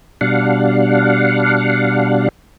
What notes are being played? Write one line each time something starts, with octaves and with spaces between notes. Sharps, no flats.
B2 G3 D4 F5 F#5